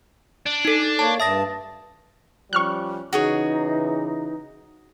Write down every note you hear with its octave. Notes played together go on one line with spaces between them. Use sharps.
D4
D#4 A4
A#3 C#5 D5 A5
G2 E5 A5 D#6 A#6
F3 G3 C#4 C#6 F6 F#6
C#3 E3 D#4 F#4 G#4 C#5